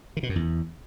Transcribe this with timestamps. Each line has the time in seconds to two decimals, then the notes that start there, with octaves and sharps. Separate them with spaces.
0.17 D#3
0.23 B2
0.29 F#2
0.36 E2